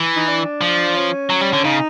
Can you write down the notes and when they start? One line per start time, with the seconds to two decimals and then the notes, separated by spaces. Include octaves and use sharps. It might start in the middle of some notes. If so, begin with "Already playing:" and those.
Already playing: E3
0.16 D#4
0.28 D4
0.61 F3
0.96 C#4
1.30 F#3
1.41 G3
1.53 D3
1.64 C#3 D#4